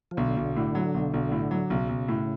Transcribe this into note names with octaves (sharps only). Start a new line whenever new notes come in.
F3
B1 D3
B1
A2
F#3
B1
B1
A2
F#3
B1 C#3
B1
A2